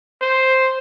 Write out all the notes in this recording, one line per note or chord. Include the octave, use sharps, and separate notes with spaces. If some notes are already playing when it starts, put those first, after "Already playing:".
C5